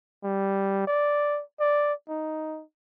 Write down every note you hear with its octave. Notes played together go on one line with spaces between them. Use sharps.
G3
D5
D5
D#4